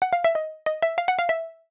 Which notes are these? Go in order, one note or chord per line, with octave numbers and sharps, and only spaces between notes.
F#5
F5
E5
D#5
D#5
E5
F5
F#5
F5
E5